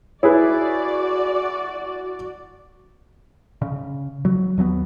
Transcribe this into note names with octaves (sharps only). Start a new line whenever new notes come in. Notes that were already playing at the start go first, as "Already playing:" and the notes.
E4 F#4 G#4 B4 C#5 D5
C#3
F#3
D#2 F#3 A3 B3